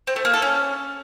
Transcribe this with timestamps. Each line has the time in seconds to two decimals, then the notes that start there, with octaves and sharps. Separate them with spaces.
0.07 C4
0.16 A3
0.25 A#3
0.33 A4
0.42 C#4